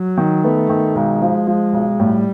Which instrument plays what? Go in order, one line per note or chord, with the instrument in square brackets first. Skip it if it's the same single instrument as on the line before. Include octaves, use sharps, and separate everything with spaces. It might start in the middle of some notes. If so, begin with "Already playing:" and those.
Already playing: [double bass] F#3
[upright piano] D#3
[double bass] A3 [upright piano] B3
[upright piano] D#3
[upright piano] B1 [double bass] G#3
[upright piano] F3
F3
B1
[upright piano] A2 [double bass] G3